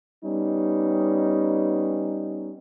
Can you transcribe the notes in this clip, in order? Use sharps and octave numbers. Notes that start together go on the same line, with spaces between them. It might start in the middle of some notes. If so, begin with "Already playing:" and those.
G3 B3 C#4 D#4